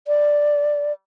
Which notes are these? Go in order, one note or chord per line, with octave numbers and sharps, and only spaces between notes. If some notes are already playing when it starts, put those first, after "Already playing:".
D5